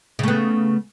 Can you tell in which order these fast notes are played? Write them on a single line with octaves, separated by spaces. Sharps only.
C#3 A3 B3